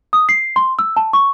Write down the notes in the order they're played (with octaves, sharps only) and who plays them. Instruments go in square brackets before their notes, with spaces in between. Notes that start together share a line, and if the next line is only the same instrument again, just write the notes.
[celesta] D#6
C7
C6
E6
A5
C#6